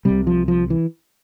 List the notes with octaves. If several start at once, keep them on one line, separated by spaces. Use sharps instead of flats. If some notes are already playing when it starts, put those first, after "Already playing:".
C2 C3 G3
F3
F3
E3